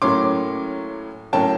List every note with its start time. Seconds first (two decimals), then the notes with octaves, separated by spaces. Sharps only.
0.02 A2 F#3 A#3 C#4 C6 D6
1.33 A2 F#3 A#3 C#4 G5 A5